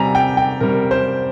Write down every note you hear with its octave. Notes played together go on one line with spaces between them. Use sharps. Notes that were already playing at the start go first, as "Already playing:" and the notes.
Already playing: C3 G3 G#5 A#5
G5
G5
C3 G3 A#4
C5